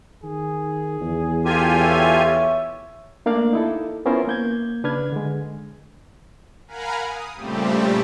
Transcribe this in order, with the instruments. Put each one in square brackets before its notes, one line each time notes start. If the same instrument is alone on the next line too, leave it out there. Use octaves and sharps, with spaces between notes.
[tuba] D#3 [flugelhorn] G#4
[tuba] E2
[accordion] F4 G4 G#5 [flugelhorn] A4
[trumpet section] C#5 E5
[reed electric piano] A3 A#3 D4 D5 F5
D#4 E4 A4
B3 C#4 E4 F4 A#4 C5
A#3 G6 G#6
C#3 D4 B4 F6 G#6
D3 G#3
[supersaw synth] A#4 F5 F#5 G#5 A#5 B5
D#6
A#2 C#3 G3 A3 C4 G4